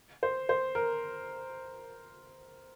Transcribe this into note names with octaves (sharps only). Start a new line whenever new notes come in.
C5
C5
A#4